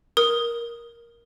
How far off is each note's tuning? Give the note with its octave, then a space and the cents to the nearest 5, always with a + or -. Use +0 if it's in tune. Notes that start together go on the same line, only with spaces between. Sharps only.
A#4 +10 D#6 +0